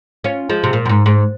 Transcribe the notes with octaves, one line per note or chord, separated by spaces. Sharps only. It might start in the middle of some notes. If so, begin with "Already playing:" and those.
C#4 F4
F3 G#3
C3
A#2
F#2
G#2
G#2